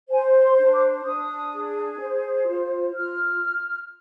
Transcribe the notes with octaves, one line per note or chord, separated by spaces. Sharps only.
C5 G#5
C6
D4
D6
D4 D#6
G#4
C5
F4
F4 F6